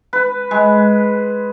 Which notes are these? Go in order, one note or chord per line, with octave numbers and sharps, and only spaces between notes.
B4
G#3